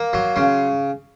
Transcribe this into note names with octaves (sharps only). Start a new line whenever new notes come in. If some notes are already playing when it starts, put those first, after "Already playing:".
Already playing: A#3
F#3 C6
C#3 C6